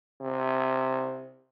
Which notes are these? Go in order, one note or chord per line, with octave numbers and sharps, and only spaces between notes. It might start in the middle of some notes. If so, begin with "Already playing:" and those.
C3